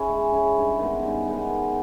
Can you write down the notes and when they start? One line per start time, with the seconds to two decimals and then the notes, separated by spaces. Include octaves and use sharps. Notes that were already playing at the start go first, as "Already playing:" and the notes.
Already playing: C#4 E4 G#4
0.09 G#3
0.32 C#4 E4 G#4
0.56 G2
0.79 D#3 G#3 B3
1.03 G2
1.26 D#3 G#3 B3
1.49 D#3